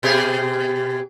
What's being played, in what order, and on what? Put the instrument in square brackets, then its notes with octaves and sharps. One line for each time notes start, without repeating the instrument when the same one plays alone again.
[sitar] B2 G4 G#4